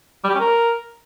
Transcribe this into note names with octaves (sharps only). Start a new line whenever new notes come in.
G3
G4
C#4
A#4